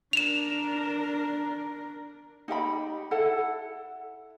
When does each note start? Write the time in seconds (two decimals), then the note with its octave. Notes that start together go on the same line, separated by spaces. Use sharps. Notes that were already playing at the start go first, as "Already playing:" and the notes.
0.13 D4 A#4 E7 F7
2.48 D#4 G4 E5 B5
3.11 E4 A4 F#5